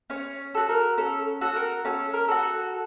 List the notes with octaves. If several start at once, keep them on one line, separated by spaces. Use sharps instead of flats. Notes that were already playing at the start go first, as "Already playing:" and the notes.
C#4 C#5
F#4 A4
A#4
C#4 A4
F#4 A4
A#4
C#4 A4
A#4
F#4 A4